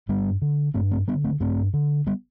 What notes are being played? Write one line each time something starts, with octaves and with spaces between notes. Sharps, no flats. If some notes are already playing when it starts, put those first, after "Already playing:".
G2 G3 B3
D3
G2 A3 C4
A3 C4
D3 G3 B3
A3 C4
G2 A3 C4
D3
G3 B3